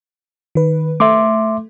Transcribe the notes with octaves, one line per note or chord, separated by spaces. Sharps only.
D#3 B4
A3 E5 C6 D6